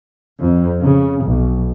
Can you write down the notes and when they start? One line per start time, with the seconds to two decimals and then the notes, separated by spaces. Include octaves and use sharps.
0.41 F2
0.83 C#3
1.23 B1